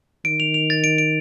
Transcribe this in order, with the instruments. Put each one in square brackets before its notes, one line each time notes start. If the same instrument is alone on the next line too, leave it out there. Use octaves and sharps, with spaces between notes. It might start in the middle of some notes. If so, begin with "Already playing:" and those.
[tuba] D#3 [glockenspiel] D7
[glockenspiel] F7
F7
A6
D7
D7